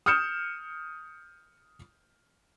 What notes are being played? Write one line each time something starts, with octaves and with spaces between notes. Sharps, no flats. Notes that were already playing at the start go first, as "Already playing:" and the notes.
D#6 F6 G6 C#7 E7